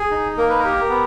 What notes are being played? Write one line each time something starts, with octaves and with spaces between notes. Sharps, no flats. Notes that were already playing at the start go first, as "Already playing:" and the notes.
Already playing: G#4
D#4
A#3 A#4
B4
A#4
G4
B3